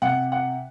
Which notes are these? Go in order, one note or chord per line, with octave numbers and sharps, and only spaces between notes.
C3 F#5
F#5